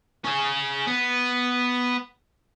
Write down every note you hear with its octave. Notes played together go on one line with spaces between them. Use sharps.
C#4 G#4
B3